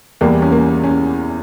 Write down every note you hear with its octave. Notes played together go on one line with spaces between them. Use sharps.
E2 E3 G3 A#3
C#4
A#3
C#4